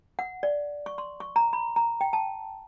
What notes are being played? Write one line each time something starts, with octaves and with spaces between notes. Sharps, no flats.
F#5
D5
C#6
C6
C#6
A#5
B5
A#5
G5
A5